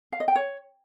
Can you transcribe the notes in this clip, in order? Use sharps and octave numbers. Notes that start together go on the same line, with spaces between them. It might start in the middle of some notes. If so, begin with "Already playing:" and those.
F5
D#5
G5
C#5